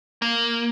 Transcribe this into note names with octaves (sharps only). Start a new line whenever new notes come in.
A#3